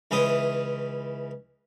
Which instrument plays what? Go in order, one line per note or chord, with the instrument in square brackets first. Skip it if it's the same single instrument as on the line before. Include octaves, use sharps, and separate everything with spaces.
[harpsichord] C#2 E3 C#4 E4 C5 D#6